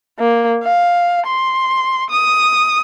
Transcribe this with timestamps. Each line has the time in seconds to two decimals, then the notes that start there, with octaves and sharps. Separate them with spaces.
0.19 A#3
0.64 F5
1.27 C6
2.10 D#6